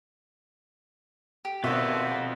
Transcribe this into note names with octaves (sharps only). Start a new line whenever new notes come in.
G4
D#2 B2 D#3 B3 C4 F4 D5 E5